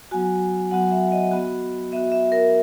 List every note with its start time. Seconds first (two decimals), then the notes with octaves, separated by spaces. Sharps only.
0.11 F#3 B3 F#4 G#5
0.71 F#3 B3 F#4 F#5
0.91 E5
1.12 D#5
1.31 B3 F#4
1.92 B3 E5
1.96 F#4
2.12 E5
2.32 A#4